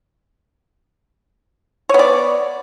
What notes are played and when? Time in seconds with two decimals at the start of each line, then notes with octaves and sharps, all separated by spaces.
1.89 C#5
1.94 B3
1.99 D5